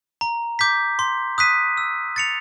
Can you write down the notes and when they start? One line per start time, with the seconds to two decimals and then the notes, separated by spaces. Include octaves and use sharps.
0.21 A#5
0.59 D6 G6 B6
0.99 C6
1.38 D#6 F#6 B6 D#7
1.77 E6
2.16 A6 C#7 F7